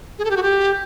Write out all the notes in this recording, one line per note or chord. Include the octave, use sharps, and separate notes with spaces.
G#4
A4
G4
F#4
G4